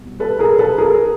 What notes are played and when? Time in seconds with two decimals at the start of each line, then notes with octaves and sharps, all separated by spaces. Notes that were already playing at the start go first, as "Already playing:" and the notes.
Already playing: C2 B2
0.20 A4 B4
0.39 G#4 A#4
0.58 A4 B4
0.78 G#4 A#4